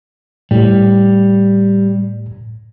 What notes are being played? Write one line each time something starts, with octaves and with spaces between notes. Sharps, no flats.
A2 G3